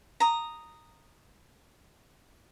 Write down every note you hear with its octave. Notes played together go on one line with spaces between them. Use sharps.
A#5 D#6